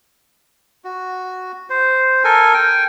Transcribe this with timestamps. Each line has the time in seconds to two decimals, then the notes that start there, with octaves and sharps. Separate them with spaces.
0.84 F#4
1.70 C5
2.24 A4 A#4 G#5
2.54 G5 G#5